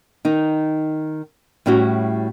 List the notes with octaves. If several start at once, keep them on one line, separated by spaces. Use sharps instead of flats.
D#3 D#4
A2 G3 C#4 E4 F#4